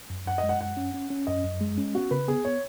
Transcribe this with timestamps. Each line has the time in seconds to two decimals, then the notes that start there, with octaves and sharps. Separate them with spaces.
0.10 F#2
0.27 F#2 F#5
0.38 D#5
0.43 G#3
0.49 F#5
0.61 F#2 F#5
0.77 C#4
0.94 C#4
1.10 C#4
1.27 F#2 D#5
1.44 F#2
1.61 G#3
1.78 C#4
1.95 B3 F#4
2.11 C#3 B4
2.28 B3 G#4
2.45 B3 C#5